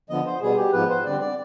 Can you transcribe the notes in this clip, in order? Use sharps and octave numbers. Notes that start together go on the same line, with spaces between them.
D3 F3 B3 D#5
C5
B2 G3 B3 G#4
G4
G#2 F3 B3 B4
C5
D3 G3 C4 D5
D5